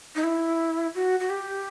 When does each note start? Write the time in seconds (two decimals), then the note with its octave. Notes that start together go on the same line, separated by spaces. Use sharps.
0.15 D#4
0.24 E4
0.95 F#4
1.20 F#4
1.30 G4